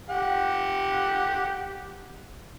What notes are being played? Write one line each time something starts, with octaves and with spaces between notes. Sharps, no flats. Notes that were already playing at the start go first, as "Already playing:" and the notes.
G4 F#5